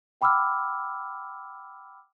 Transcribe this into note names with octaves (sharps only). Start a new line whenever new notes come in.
F#5 G5 B5 D6 E6 F6